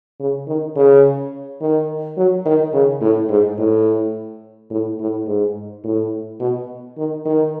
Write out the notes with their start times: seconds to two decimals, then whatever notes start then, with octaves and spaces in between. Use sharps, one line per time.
0.20 C#3
0.48 D#3
0.76 C#3
1.61 D#3
2.17 F#3
2.45 D#3
2.74 C#3
3.01 A2
3.29 G#2
3.59 A2
4.71 A2
5.00 A2
5.27 G#2
5.84 A2
6.40 B2
6.97 D#3
7.25 D#3